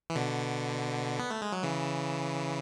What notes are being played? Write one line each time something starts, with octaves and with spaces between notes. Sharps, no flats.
E3
B2 D3
B3
A3
G#3
F#3
C#3 E3